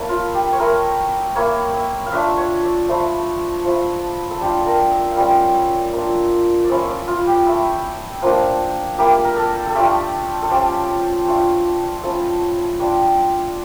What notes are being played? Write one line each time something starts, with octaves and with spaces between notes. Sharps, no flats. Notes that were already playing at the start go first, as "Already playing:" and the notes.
Already playing: A#3 E4 A4 C#5
F4
G4
C#5
A3 E4 A#4
A#3 E4 C#5
E5
F5
A3 D4 F4 E5
C#5
D5
F3 A3 E4
F3 A3 E4
A4
G3 D4 F4 G4
A4
A#4
E5
F5
G3 C#4 F4 E5
A#3 D4 F4
D5
F3 C#4 E4 E5
C#5
D5
F4
G4
A3 E4 E5
F3 A#3 D4
A#3 E4 G4
A#4
A4
A4
A3 D4 F4 G4
A4
F3 C#4 F4 G4
A3 D4 F4
F3 C#4 E4 A4
G3 D4 F4 D5